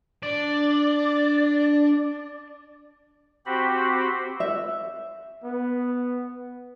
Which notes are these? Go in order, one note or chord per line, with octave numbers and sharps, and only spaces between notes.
D4 D5
C4 F#4 G4 C5 B5
E5
B3